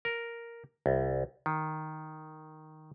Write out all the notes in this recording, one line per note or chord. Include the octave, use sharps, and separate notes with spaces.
A#4
C2
D#3